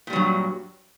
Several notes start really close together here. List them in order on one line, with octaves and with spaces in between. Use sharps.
A#2 G3 F#3 G2